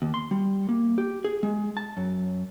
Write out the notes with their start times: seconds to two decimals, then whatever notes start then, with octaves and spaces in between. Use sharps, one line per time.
0.02 D#2
0.14 C6
0.31 G3
0.69 A#3
0.98 G4
1.24 G#4
1.43 G#3
1.77 A5
1.97 F#2